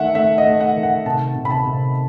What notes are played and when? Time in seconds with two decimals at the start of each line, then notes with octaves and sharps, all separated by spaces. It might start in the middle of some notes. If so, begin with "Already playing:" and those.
Already playing: D#3 A3 E5 F#5
0.15 A3 E5
0.38 D#5
0.46 A3
0.61 F#5
0.75 D#3
0.83 F#5
1.05 C3 A5
1.35 C3
1.45 B5
1.51 A5
1.65 C3